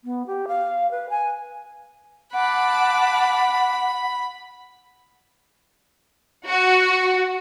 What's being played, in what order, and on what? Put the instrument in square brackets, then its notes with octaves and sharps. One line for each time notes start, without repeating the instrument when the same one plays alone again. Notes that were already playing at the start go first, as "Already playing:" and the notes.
[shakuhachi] B3
G4
F5
B4
G#5
[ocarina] F#5 [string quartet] A5 D6 F#6 [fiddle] B5
[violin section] F#4